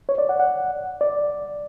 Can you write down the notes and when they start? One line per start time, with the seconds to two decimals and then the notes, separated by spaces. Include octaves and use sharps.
0.09 C#5
0.18 D5
0.29 F#5
0.39 F#5
1.01 D5